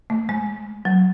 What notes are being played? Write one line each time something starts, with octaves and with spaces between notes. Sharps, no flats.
A3
G#3
F#3